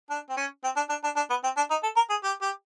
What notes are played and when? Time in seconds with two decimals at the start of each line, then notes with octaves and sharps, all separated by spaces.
0.10 D4
0.29 C4
0.37 C#4
0.64 C4
0.76 D4
0.89 D4
1.04 D4
1.16 D4
1.30 B3
1.44 C4
1.57 D4
1.70 D#4
1.83 A4
1.96 A#4
2.10 G#4
2.23 G4
2.42 G4